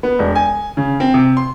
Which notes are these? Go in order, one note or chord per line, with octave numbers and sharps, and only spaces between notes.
B3
E1
G#5
C#3
C4
C3
C6